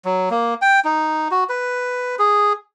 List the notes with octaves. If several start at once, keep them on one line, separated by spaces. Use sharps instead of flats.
F#3
A#3
G5
D#4
F#4
B4
G#4